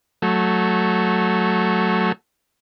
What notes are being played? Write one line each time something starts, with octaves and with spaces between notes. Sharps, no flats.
F#3 A3